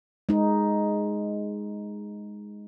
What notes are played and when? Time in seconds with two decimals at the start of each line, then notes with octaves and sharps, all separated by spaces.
0.29 G#3 D#4